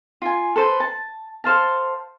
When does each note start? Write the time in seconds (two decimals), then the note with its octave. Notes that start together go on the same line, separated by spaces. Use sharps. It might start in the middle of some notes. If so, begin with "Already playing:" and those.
0.22 F4 G#5
0.56 A4 B4 C5
0.80 A5
1.44 A4 C5 F5 A5